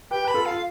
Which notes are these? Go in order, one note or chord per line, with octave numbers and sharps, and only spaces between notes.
G4 B4 G5
B4 B5
F4 A4
F5
F4